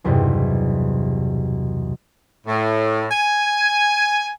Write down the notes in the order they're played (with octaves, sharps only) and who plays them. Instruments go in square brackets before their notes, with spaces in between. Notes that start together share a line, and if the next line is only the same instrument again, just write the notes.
[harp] B1 E2 G2 C3
[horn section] A2
G#5